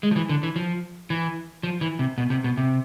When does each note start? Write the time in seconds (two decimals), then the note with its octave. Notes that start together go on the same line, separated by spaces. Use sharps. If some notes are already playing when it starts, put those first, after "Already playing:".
0.03 G#3
0.11 F3
0.16 E3
0.29 D3
0.43 E3
0.56 F3
1.10 E3
1.63 F3
1.81 E3
1.99 C3
2.18 B2
2.30 C3
2.44 B2
2.57 C3